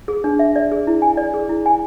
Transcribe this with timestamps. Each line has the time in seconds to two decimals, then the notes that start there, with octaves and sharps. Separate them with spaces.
0.08 G#4
0.24 D4
0.39 E5
0.56 D5
0.71 G#4
0.87 E4
1.02 G#5
1.17 D5
1.34 G#4
1.49 E4
1.66 G#5